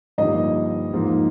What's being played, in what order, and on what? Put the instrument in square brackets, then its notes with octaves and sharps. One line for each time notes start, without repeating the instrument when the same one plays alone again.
[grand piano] G2 D3 F3 A#3 D#4 D#5
G#2 F3 A#3